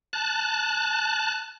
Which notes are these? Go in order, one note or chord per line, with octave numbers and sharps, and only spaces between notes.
A5 F#6